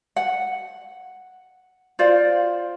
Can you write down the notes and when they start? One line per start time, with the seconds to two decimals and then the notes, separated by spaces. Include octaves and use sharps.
0.16 F#5
1.99 F4 C5 D5 F5